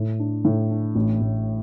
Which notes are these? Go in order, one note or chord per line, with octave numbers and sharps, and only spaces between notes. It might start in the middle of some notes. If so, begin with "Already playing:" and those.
Already playing: A2
D4
A2
D4
A1
A1